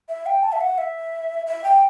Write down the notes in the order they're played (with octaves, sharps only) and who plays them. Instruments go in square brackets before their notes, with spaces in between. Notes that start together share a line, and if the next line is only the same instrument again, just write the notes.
[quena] E5
G5
A5
E5
F#5
E5
E5
G5